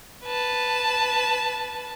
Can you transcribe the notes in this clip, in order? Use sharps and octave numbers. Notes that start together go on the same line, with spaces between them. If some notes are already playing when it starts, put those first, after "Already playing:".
B4 A5